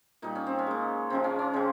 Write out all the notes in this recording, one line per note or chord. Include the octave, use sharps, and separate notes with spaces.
A#2 G3 D#4
C#4
C4
C#4
A#2 G#3
C#3 F3 G#3 C4
C#4
C#4
C#3 G#3 C4